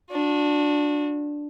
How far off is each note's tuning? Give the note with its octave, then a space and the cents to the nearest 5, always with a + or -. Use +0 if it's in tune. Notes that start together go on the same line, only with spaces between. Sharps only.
D4 +0 F#4 -35